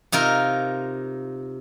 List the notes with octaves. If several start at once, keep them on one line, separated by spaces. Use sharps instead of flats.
C3 D#4 F4 A#4